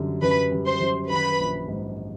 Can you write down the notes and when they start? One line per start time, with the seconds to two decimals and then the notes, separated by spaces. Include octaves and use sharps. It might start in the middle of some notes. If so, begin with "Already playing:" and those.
Already playing: F#2 D3 G3
0.22 F#2 B4 B5
0.52 G3
0.66 C5 C6
0.80 F#2
1.10 D#3 B4 B5
1.39 A#1
1.68 G#2